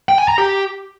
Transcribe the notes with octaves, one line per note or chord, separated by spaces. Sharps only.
G5
G#5
A#5
G4